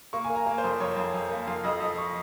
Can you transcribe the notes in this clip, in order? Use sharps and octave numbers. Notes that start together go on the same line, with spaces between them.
A#3 C#6
G#5
A#3
A#5
A#3
C5
F2
F2 C#5
F2
F2
A#3
F2 F5
F2 D#5
F2 D#5
C#6